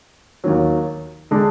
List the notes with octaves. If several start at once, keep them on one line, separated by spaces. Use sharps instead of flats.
D#2 D#3 F#3
D3 G#3 D4